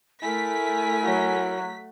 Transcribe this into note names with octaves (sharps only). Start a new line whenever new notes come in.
A3 E4 A#4 G#5 B6
F#3